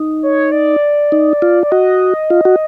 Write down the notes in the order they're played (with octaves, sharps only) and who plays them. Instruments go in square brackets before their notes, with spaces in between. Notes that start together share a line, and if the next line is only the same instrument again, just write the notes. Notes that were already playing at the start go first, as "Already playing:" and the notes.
Already playing: [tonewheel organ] D#4
[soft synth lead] C#5
D5
[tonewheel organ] D#4
F4
[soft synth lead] D5
[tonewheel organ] F#4 [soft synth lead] D#5
[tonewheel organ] F4
F#4